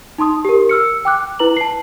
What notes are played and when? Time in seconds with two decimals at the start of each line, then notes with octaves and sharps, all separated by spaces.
0.18 D#4 A5 C6 D#6
0.45 G4 A#4
0.69 E6 F6 C#7
1.05 G5 D6 F#6
1.39 E4 B4 A#5 F#7
1.57 A5 C7